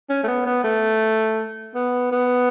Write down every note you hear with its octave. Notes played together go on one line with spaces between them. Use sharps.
C#4
A3
B3
B3
A3
B3
B3